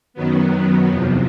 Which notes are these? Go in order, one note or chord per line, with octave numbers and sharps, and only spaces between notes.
F#2 D#3 F#3 B3
E2 C3 F3